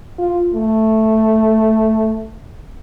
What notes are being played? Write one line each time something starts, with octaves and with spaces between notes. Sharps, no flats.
F4
A3